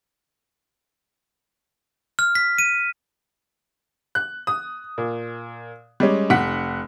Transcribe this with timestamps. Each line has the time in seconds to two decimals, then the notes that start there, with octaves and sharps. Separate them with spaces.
2.19 F6
2.35 B6
2.58 D#7
4.15 F#6
4.47 D#6
4.98 A#2
6.00 G3 G#3 C#4
6.30 F1 F#5 B6